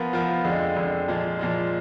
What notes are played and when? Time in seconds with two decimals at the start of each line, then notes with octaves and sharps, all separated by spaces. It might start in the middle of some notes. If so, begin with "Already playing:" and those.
Already playing: F3 B3 F4 A#4
0.13 F3 B3 F4 A#4
0.44 F2 D3 G#3
0.76 F2 D3 G#3
1.08 A#2 F3 G#3
1.39 A#2 F3 G#3